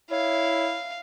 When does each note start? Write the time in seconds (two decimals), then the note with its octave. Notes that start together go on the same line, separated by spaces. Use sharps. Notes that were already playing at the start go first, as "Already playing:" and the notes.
0.11 E4 C#5 F5